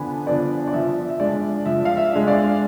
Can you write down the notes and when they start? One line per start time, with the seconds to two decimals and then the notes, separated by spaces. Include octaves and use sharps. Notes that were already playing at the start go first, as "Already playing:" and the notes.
Already playing: D3 F3 B3 D4 G#5 B5
0.27 F3 B3 D4 D5
0.68 D5
0.73 F3 E5
1.09 E5
1.20 G#3 D4 D5
1.66 F3 E5
1.85 F5
1.97 E5
2.12 G#3 D4
2.27 D5 F5